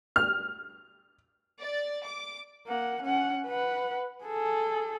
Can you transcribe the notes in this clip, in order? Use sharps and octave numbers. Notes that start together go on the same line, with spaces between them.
F6
D5
D6
A#3 F#5
C#4 F#5
B4 F#5
G#4 A4